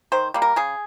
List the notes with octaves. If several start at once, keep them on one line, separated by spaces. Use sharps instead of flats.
D#3 C5
G3 A#3
A#4
C#3 G#4